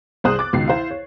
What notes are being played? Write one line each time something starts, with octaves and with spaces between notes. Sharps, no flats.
C2 G#4 C5 D#6 F#6
D6 A6
C#2 B2 D#3 C7
E4 C5 F5
C#5